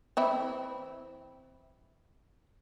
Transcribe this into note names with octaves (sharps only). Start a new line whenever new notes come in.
E3 C4 E4